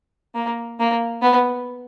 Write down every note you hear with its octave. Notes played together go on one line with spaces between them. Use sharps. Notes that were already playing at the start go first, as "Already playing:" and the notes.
A#3
A#3
B3